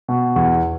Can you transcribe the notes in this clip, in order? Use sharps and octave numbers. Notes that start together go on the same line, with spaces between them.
B2
E2